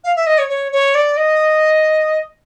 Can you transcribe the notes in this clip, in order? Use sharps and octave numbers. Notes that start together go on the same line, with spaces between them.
F5
E5
D#5
C#5
C#5
C#5
D5
D#5